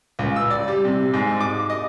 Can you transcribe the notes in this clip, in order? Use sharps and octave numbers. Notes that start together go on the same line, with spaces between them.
C#2
E6
D5
G3
C3
G#2
D6
D#5